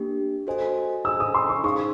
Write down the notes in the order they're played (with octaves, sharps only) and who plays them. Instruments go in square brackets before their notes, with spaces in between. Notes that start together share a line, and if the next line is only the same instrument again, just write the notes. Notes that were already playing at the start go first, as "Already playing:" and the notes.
Already playing: [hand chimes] A#3 D4 G4
F#4 A4 C5 D#5 G#5
[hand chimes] G#4 C5 D#5 G#5 [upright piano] E6
[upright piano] D#6
C6
C#6
[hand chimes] D#4 G#4 C5 F5 [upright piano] C#6